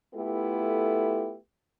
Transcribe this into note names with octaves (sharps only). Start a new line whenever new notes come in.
A3 B3 E4 F4 G4 A4